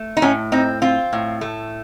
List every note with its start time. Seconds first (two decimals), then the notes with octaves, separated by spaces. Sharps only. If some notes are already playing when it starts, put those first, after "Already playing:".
Already playing: A3
0.17 D#4
0.22 A2 C#4
0.52 C4 D#4
0.82 C4 F4
1.13 A2
1.41 A3